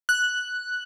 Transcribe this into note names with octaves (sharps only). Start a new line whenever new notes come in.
F#6